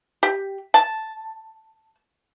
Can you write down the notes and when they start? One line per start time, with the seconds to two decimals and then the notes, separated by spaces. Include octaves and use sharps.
0.23 G4
0.74 A5